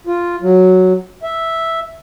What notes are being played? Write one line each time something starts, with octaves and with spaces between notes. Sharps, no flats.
F4
F#3
E5